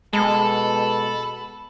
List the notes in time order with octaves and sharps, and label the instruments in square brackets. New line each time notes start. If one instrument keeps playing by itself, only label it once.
[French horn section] B2 [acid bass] G#3 [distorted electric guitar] A4 [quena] B5